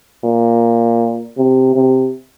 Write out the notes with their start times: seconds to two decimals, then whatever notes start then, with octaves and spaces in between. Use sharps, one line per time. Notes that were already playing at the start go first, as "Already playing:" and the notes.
0.24 A#2
1.37 C3
1.75 C3